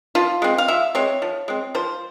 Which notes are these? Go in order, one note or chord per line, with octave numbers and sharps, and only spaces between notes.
F3 F4
G#3 C4
F5
F3 E5
G#3 C4 C#5
F3
G#3 C4
F3 C5